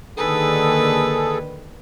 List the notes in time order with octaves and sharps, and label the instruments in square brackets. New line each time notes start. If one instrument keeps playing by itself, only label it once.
[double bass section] D3 D#3 A#3 [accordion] G#4 A4 [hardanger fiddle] B4